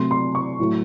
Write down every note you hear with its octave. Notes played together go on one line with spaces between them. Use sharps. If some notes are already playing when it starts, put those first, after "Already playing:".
Already playing: C3 F#3 A3 C6
C6
C#6
A2 F#3 A3